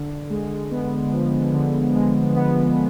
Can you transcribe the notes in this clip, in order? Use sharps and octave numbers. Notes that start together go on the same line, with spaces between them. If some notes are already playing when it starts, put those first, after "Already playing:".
Already playing: D3
G#3
B3
F3
D3
G#3
B3